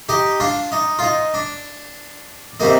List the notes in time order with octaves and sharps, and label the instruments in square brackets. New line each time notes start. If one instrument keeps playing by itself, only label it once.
[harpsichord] D#4 G4
D4 F4
D#4
F4
D#4
D4
C3 G3 A#3 D#4